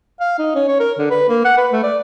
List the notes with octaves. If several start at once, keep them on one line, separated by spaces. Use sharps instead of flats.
F5
D#4
C#4
C#5
A#4
D3
B4
A#3
F#5
B4
A3
D5